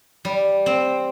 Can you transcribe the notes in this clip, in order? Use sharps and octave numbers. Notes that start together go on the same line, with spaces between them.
G3
C4